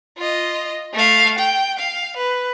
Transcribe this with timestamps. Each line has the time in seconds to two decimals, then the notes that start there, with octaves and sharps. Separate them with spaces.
0.18 F4 D#5
0.94 A3 F5
1.39 G5
1.79 F5
2.17 B4